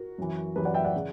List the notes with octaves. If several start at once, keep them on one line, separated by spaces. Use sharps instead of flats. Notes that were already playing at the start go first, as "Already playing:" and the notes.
Already playing: F#4 A#4
F#2 E3
F#2 E3 G4 B4
D5 F#5
E5 G5
D5 F#5
C#3